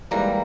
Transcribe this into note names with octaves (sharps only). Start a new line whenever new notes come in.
G#2 E3 G3 A#3 A#5